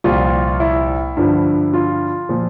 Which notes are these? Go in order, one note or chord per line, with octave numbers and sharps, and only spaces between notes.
C2 A#2 F3 F4
E4
G2 D3 F3
F4
A#2 F3